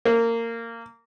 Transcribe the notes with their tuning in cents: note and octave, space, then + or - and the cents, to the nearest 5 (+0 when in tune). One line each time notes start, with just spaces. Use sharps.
A#3 -20